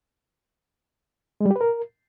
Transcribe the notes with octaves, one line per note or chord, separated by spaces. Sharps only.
G#3
G3
G4
B4
A#4